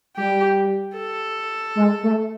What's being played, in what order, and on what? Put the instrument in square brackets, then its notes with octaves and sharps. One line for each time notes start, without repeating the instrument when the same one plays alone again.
[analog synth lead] G3 [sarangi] G4
[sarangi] A4
[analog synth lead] G#3
A3